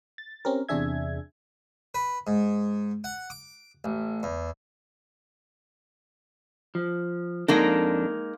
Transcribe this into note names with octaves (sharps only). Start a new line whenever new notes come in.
A6
C4 C#4 G4 A#4
E2 C3 D4 G#4 E5 G#6
B4
G#2
F#5
D6
A1
E2
F3
F2 G#3 A#3 D4 D#4 A4